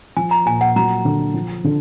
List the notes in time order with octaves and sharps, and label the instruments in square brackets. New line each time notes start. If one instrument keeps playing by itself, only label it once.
[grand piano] F3 [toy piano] G#5
[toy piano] A#5
[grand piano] A#2 [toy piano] G#5
[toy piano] F#5
[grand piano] F#3 [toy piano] A#5
[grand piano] D3
F3
D3